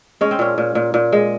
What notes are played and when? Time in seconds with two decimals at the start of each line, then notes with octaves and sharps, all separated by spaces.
0.21 G#3 C#4
0.31 C4
0.39 A#2 C#4
0.58 A#2
0.75 A#2
0.94 A#2
1.13 G#3